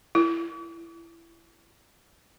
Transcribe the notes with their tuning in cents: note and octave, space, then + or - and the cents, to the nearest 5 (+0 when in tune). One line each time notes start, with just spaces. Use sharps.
E4 +25